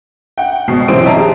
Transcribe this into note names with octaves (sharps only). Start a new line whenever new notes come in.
F#5 G5
G#1 B2 C7
F#2 C3 E3 C4 C5 D7
D#4 C#5 E5 A5 A#5
G4 G#4